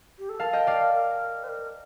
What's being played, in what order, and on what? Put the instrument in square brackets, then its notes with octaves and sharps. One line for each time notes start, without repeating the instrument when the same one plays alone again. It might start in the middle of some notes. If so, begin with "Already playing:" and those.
[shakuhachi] G4
A4
[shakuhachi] A#4 [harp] F5 A5
[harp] D#5 G5
D5 F5
[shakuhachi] A#4
C5
A#4